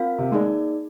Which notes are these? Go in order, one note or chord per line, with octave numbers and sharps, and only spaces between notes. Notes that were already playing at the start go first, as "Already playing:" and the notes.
Already playing: C4 F4 A#4 F5
C3
G#3 A#3 D#4 G#4 D5